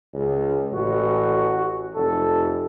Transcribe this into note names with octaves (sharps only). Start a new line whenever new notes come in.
C#2
A1 F#4
F1 A4